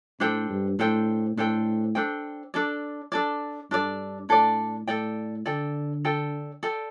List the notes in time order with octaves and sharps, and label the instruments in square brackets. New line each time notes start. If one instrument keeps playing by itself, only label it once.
[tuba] A2 [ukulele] D4 A4 C5 G5
[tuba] G2
[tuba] A2 [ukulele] D4 A4 C5 G5
[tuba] A2 [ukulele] D4 A4 C5 G5
[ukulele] D4 A4 C5 G5
D4 A4 D5
D4 A4 D5
[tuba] G2 [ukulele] D4 A4 D5
[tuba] A2 [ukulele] D4 A4 D5
[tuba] A2 [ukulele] A4 D5 G5
[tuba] D3 [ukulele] A4 D5 G5
[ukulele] A4 D5 G5
A4 D5 G5